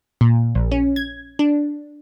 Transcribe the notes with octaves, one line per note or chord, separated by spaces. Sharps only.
A#2
A#1
C#4
G#6
D4